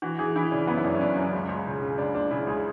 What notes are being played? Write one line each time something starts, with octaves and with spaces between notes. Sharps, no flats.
E3 F#4
E3 G#4
E3 E4
C#3 D4
F#2 B3
E4
F#2 D4
C#4
F#2 D4
F#2 C#4
C#2
C#2
C#3
C#3
C#2 D4
C#2 D4
C#3 E4
C#2 G#4